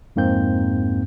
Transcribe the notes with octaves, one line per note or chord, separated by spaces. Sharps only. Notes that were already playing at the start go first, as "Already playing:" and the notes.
F2 G#2 A#3 C4 G6